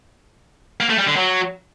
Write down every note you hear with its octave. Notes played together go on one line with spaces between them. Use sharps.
A#3
A3
G3
D3
F#3